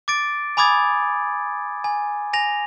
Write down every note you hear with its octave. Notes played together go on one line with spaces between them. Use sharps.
D6 A6 D7
G#5 B5 D6 D#6 G#6 A6
G#5
G#5 A#6 F7